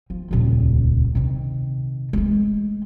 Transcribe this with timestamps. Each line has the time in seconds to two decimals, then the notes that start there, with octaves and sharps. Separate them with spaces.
0.10 F3
0.31 D#1 C#2
1.15 C3 D#3
2.13 G#3 A3